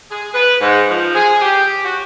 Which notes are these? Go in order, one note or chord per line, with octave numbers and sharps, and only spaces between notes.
G#4
B4
G#2
F3
G#4
G4
F#4